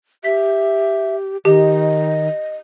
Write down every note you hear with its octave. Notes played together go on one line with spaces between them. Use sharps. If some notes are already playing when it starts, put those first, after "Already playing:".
G4 E5 B6
D#3 G4 D#5